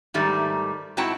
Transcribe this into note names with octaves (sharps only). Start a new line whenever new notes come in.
G#2 D#3 G3 A3
G#2 C4 E4 F#4 G5 A5